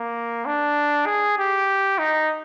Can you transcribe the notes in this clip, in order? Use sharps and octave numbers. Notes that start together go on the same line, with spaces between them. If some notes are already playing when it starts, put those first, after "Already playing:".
Already playing: A#3
D4
G#4
G4
D#4